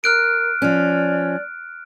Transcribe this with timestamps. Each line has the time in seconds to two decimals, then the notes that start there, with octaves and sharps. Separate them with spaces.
0.04 A#4 F6 F#6 D7
0.62 F3 C#4 D5